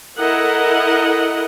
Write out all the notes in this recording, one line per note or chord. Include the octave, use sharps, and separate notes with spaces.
E4 A4 A#4 D#5 F#5